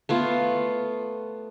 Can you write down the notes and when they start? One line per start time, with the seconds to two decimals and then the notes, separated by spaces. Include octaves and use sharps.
0.09 A3 B3 F4